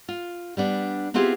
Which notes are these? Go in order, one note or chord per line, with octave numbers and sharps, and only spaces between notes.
F4
G3 B3 D4
B3 C4 E4 F4 G4 G#4